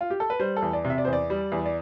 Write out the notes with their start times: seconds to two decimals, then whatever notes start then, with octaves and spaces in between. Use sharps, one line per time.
0.01 F4
0.10 G4
0.20 A4
0.30 B4
0.40 G3 C5
0.57 A4
0.62 E2
0.73 D5
0.84 C3
0.90 E5
0.98 D5
1.05 C5
1.07 E2
1.13 D5
1.30 G3
1.52 E2
1.66 D5